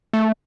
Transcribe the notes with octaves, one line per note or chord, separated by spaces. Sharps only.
A3